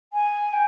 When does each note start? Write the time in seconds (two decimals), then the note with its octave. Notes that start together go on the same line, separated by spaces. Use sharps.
0.13 G#5
0.52 G5